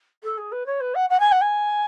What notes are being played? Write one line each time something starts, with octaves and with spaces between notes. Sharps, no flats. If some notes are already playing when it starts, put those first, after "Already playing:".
A4
G#4
B4
C#5
B4
F#5
F#5
G#5
F#5
G#5